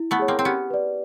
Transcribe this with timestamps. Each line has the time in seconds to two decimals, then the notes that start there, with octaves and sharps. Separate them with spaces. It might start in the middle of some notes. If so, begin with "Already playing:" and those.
Already playing: E4
0.11 A3 B3
0.19 G#4 C#5
0.28 A#3 C4
0.39 C4
0.45 B3 C#4 G4
0.70 B4 D5